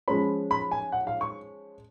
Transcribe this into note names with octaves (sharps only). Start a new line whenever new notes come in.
F3 G#3 C#4 B5
B5
G#5
F#5
F5
C#6